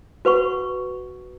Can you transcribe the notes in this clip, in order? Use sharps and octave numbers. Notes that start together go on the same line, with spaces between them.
F#4 B4 F#5 C#6